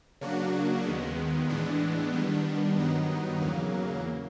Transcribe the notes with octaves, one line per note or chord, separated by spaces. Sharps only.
C#3 F#3 A#3 D4 F#4
D#2 D#3 G#3 B3
A2 E3 G#3 B3 D4
D#3 G3 B3 D4
G2 D#3 F#3 B3 D#4
E2 C#3 F#3 A#3